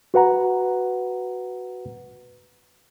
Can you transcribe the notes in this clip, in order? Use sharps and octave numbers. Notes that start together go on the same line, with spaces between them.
F#4 B4 F#5 A#5